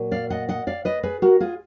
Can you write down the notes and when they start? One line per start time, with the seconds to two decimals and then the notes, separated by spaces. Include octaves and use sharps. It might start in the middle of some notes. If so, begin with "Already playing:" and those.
Already playing: A#2 F#3
0.12 D5 F5
0.30 D#5 F#5
0.49 D#5 F#5
0.67 D5 F5
0.85 B4 D#5
1.03 G#4 B4
1.22 F#4 A#4
1.40 F4 G#4